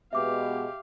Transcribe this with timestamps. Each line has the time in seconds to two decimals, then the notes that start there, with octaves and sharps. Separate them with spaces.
0.13 B2 G#3 B3 G4 E5 F5 D6